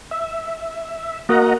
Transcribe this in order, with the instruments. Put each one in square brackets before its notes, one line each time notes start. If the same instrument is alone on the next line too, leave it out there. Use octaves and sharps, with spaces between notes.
[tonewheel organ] E5
[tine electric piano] A#3 F#4 A#4 [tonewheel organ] D#5 F#5 A#5